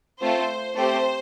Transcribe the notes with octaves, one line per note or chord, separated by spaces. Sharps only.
A3 C4 F4 A4 C5
A3 C4 G4 C5